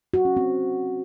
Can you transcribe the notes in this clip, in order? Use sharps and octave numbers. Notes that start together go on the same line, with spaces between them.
F#4
C#4
C4